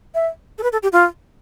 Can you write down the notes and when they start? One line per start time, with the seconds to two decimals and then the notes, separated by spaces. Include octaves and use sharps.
0.15 E5
0.58 A4
0.63 B4
0.73 A4
0.83 G4
0.92 F4